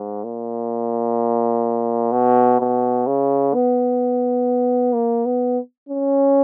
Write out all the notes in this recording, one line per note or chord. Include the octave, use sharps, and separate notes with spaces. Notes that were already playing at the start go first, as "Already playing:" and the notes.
Already playing: G#2
A#2
B2
B2
C#3
B3
A#3
B3
C#4